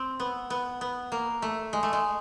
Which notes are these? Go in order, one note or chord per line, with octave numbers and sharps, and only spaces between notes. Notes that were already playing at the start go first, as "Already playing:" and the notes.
Already playing: C4
B3
B3
B3
A#3
A3
G#3
A3
G#3